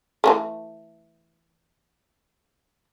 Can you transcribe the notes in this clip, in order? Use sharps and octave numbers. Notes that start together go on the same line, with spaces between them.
E3 G#3 A3